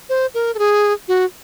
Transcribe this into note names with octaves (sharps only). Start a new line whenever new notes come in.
C5
A#4
A4
G#4
F#4